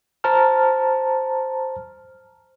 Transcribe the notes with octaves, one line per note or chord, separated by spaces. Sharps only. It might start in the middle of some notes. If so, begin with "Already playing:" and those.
C5 A5 A#5 F6